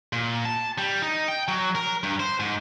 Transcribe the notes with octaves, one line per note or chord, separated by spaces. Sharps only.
A#2
A5
G3
D#4
G5
F#3
A#4
G2
C5
G#2